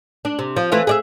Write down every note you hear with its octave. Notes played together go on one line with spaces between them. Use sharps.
D4
C3
F3
E3 A3 F4
G#4 D5 E5